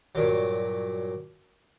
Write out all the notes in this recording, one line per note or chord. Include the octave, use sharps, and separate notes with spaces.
G2 A#2 F#3